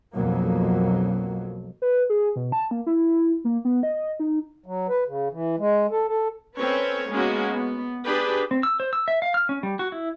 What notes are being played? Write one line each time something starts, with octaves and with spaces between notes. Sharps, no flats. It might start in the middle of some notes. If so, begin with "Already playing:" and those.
B1 F2 F#3 A#3
B4
G#4
B2
A5
A#3
E4
A#3
B3
D#5
D#4
F#3
B4
C#3
E3
G#3
A4
A4
C4 C#4 A4 B4 C#5
G#3 A#3 B3 C#4 F#4
B3
D4 G4 G#4 B4
C4
E6
C5
E6
E5
F5
F6
C#4
G3
F#4
E4